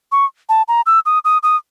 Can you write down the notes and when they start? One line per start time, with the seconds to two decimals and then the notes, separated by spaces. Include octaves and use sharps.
0.12 C#6
0.49 A5
0.68 A#5
0.86 E6
1.06 D#6
1.25 D#6
1.43 D#6